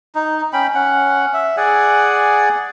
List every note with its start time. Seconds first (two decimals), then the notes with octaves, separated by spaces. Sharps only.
0.15 D#4
0.53 C#4 G5 B5
0.75 C#4 F#5
1.34 E5
1.57 G#4 D5 F#5 G#5